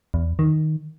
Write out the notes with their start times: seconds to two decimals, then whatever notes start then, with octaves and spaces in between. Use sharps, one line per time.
0.14 E2
0.39 D#3